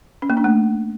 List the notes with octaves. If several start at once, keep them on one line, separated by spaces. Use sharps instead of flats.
C#4
A#3
D4
A3